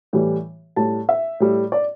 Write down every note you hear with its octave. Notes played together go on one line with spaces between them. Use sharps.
A2 E3 G3
A2 G3 A5
E5
A2 G3
D5